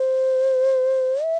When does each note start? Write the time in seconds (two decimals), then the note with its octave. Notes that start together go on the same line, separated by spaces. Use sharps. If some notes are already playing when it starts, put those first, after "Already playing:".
Already playing: C5
1.23 E5